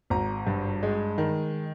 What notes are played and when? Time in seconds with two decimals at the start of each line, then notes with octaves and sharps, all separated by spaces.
0.10 G#1 A#5
0.47 G2
0.83 G#3
1.18 D#3